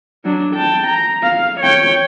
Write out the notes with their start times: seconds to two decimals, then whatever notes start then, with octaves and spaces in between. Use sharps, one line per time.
0.25 F#3 D4
0.54 G5 A5
0.87 A#5
1.23 F5
1.60 C#5 G5